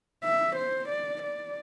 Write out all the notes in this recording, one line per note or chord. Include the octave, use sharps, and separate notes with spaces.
E5
C5
D5
D5